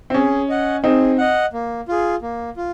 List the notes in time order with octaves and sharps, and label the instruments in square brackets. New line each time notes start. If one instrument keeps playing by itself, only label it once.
[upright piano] C4
[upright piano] C#4 [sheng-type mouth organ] G#4
[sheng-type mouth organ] D#5 F#5
[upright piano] C4 D#4 [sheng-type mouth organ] G#4
[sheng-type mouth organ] D#5 F#5
A#3
F4 G#4
A#3
F4